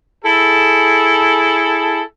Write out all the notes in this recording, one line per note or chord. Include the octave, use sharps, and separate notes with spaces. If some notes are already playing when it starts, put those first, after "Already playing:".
E4 G#4 A4